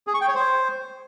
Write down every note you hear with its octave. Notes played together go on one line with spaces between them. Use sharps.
G#4
C#6
G5
C#5
C5